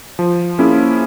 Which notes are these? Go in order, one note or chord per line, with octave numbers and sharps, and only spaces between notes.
F3
A#3 C#4 E4 G#4